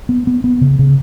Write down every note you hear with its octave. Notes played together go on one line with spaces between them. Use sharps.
B3
B3
B3
C#3
C#3